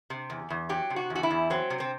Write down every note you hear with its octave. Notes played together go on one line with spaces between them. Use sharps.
C3
E2
E2
F#3 G4
C3
F#4
E2
F#4
E4
E2
F#3 C4
C3
C4